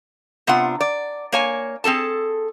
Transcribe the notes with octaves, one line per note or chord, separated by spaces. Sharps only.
C3 B3 D4 F4 F#5
D5
A#3 C#5 G#5
C4 G#4 A4 A5